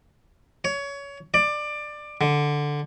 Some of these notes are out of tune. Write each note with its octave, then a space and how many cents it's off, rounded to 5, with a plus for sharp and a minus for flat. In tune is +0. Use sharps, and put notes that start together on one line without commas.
C#5 +20
D5 +20
D3 +0